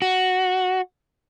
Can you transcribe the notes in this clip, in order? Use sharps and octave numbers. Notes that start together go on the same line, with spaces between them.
F#4